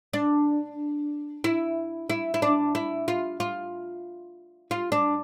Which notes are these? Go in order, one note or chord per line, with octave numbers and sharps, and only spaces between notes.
D4
E4
E4
E4
D4
E4
F4
F4
F4
D4